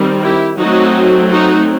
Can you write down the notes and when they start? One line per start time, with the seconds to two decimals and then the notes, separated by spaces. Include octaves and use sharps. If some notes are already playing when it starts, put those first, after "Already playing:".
Already playing: D#3 G3 C4
0.21 E4 G4
0.58 F#3 A3 C4 D#4 F#4
1.32 D#4 F#4